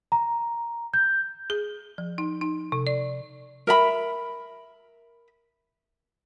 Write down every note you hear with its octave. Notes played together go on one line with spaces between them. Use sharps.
A#5
G6
G#4
F3
D#4
D#4
C3
D5
A#4 E5 B5